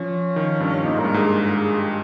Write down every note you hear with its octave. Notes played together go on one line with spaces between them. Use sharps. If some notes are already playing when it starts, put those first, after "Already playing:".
Already playing: F3 C#4
D#3
G2
A#2 D#4
G#2
G2 A#4
G#2 G#4
A#4
G#4
G#4
G4